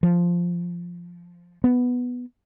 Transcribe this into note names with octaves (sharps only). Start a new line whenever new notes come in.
F3
B3